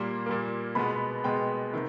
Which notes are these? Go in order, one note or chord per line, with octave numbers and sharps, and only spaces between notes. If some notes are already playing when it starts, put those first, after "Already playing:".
Already playing: A#2 G3 A#3 C6
A#2 G3 A#3
B2 G#3 B3 B5
B2 G#3 B3 G5
C3 D#3